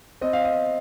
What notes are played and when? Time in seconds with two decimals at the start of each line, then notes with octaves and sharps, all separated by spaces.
0.21 C4 D#5
0.33 F5
0.45 D#5